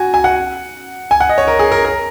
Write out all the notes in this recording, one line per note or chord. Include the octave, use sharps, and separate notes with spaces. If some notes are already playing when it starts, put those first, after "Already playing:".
Already playing: F#4 G#5
G#5
F#5
G#5
F#5
D#5
C#5
A#4
G#4
A#4
A#4